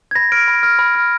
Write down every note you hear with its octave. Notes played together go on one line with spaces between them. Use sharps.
G#6
B5 A#6
F6 D7
B5
F6
B5
F6